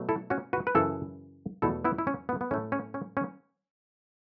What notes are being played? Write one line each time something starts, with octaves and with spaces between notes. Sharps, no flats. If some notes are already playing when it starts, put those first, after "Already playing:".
Already playing: B2 F#3 A3
E4 A4
C#4 F#4
F#4 B4
B4
F#2 C#3 E3 E4 A4
E2 B2 A3 E4 A4
B3 E4
E4
C#4
B3
B3
A2 A3 C#4
C#4
C#4
C#4